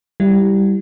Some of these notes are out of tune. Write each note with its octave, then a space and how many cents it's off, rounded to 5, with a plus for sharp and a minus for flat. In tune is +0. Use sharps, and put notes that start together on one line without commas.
G3 +0 E4 +15